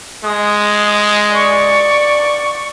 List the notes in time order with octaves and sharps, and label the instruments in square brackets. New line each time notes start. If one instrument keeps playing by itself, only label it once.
[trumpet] G#3 [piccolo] D#6
[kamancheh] D5 [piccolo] C#6